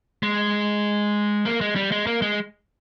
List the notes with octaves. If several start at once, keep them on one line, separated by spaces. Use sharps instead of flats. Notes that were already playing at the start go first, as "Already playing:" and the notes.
G#3
A#3
G#3
G3
G#3
A#3
G#3